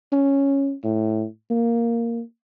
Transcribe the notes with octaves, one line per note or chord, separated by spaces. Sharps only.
C#4
A2
A#3